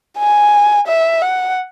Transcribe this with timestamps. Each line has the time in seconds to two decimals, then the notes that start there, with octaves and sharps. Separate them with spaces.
0.18 G#5
0.87 E5
1.22 F#5